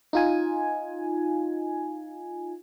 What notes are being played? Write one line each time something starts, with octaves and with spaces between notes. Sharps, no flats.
D#4 F4 G#5